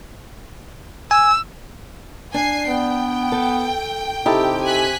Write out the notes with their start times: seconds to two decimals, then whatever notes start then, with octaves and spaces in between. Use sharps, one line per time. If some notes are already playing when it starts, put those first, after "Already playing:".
1.11 G#5 E6
2.34 D4 G#5 C7
2.68 B3 G5
3.32 A4
4.26 C3 D#4 E4 G4 A4
4.65 G#5 F#6 B6